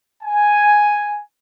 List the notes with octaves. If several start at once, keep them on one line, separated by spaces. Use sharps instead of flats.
G#5